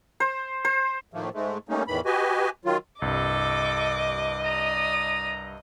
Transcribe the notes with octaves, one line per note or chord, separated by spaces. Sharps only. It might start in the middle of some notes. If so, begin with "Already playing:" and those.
C5
C5
A2 D#3 F3 A3 A#3
G#2 G#3 A3
G3 A3 A#3 C#4 D#4
E2 A2 D#3 E3 B5
F#4 G4 B4 D#5 G#5
D#3 F#3 F4
C2 G2 A4 D#5 D6
D5 A#5 D#6